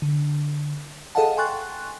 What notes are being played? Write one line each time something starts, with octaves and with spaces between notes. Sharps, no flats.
D3
G#4 A4 D#5 F5 F#5 A5
G5 G#5 C6 C#6 F#6 A6